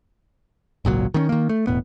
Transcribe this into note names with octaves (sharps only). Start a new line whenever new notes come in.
G#1 C#2 A#2 F#3
D#3 B3 C#4
D#3 A#3
A3
E1 A2 B3